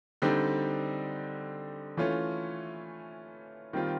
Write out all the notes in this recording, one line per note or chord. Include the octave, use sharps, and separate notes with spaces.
D3 G3 C4 D#4 G4
E3 A3 C#4 F4
D#3 G3 C4 F4